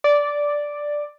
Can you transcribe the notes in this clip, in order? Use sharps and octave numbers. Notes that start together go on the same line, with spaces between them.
D5